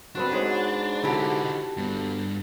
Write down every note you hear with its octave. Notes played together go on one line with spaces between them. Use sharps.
B3 C4 D4 F#4
G#2 B4 C#5 D#5
D3 D#4 E4 F#4 G4 A4
G1 G2